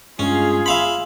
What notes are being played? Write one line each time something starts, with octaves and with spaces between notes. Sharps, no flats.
G2 G#3 C#4 F4 G#4
E5 F5 B5 C6